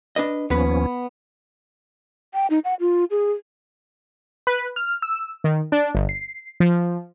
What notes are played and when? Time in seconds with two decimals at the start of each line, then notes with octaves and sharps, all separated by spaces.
0.16 D4 B4 D#5
0.50 D#2 F3 B3 C#4 B4
2.34 G5
2.50 D#4
2.65 F#5
2.80 F4
3.11 G#4
4.47 B4
4.76 F6
5.02 E6
5.44 D#3
5.72 D4
5.95 G1
6.09 C7
6.60 F3